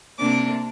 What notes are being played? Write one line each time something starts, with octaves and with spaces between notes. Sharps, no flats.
C3 A#3 D4 D6